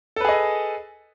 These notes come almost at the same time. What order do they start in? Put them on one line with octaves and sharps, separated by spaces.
A4 B4 G#4 D#5